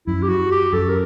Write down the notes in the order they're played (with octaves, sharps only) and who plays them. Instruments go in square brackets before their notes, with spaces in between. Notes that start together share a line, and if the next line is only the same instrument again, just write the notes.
[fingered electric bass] F#2 [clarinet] E4
[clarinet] G4
F#4
G4
[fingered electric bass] F#2 [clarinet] A4
[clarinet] A#4